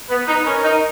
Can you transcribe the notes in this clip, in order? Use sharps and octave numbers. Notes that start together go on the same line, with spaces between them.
B3 B4
D#4
C#4 A#4
D#4